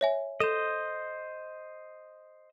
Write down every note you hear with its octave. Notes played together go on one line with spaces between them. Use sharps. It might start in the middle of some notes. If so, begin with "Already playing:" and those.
C#5 E5 G#5
A4 C5 D#5 E7